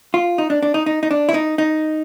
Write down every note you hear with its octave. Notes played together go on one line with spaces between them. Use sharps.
F4
D#4
D4
D4
D#4
D#4
D#4
D4
E4
D#4
D#4